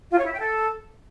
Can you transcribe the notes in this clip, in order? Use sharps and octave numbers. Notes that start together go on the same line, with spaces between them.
F4
C#5
E4
G5
A4